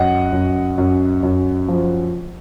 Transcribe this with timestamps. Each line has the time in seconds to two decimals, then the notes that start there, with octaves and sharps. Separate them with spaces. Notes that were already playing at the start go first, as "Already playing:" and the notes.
Already playing: F#2 D#5 F#5
0.32 F#2
0.78 F#2
1.23 F#2
1.68 F3